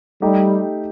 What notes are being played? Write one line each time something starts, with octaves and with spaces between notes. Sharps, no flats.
G3 A3 D#4 G4